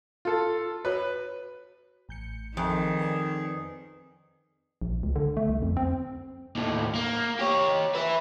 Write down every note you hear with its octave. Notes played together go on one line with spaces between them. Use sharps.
F4 A4
F#4 B4 C#5
A1 G6 C#7
F2 D#3 G#4
B4 D5
A#1
C#2
D3
A3
C2
F2
C4
D#2 A2
A#3
G4 C#5
B4 E5